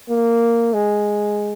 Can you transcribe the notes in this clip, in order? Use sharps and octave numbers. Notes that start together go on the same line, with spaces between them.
A#3
G#3